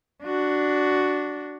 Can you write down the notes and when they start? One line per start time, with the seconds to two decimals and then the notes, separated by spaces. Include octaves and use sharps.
0.24 D4 F#4